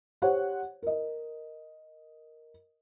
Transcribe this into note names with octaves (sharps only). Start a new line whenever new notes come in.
G4 C5 C#5 F#5
A#4 D#5